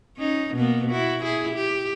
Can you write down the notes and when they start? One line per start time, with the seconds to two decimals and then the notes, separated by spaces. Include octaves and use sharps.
0.18 C#4 D#4
0.55 B2 A#3 B3
0.90 E4 F#4
1.23 E4 G#4
1.54 G4